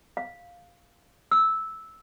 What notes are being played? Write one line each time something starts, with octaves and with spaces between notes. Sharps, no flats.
F5
E6